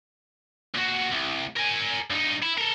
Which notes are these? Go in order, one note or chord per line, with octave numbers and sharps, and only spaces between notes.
A#2 F#4
C2
A#4 G#5
G2 D#4
E4
A4 A#4